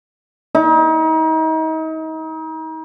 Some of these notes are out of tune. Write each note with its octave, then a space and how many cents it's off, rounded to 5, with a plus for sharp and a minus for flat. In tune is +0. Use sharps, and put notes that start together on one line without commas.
D#4 +35